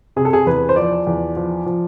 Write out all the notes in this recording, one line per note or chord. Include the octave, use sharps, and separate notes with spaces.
C3 G#4
A4
G#4
E2 B4
C5
F3 D5
E2
F3
F3